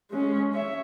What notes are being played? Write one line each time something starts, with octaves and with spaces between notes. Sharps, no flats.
G#3 C#4
C#5 E5